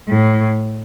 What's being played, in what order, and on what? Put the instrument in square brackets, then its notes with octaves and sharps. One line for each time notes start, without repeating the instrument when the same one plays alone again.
[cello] A2